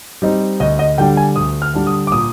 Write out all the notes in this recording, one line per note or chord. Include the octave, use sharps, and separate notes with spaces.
G3 C4 D#4
D2 D#5
D#5
D3 G3 D4 G5
G#5
D2 D#6
F6
D3 G3 D4
D#6
D6
A#2 D#6